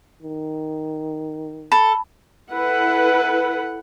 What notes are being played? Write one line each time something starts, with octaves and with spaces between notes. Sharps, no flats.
D#3
A4 B5
E4 A4 B4 F#5